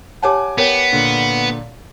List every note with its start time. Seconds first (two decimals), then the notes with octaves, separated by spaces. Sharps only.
0.22 G4 C#5 F#5 G#5 A5 D6
0.58 B3 A#4 C#5 G5
0.92 A#2 D3